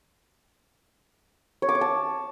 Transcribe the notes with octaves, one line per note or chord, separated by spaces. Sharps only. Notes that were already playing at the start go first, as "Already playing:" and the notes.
C#5
D6
C#6
A5